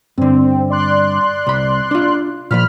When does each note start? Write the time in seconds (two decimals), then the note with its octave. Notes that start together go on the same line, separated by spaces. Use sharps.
0.18 G2 D3 C4
0.70 D5 C6 F#6
1.47 C2 B5
1.91 D4 F4
2.51 A#2 E3 F3 B5 F6